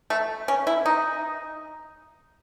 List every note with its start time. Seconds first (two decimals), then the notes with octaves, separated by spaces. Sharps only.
0.10 A3
0.48 C#4
0.67 E4
0.86 D#4